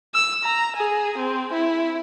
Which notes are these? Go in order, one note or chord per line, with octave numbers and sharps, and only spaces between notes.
E6
A#5
G#4
C4
E4